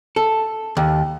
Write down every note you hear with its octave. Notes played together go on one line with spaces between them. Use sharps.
A4
D#2